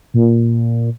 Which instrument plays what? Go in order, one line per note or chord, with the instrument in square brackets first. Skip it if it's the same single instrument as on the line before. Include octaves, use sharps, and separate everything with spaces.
[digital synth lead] A#2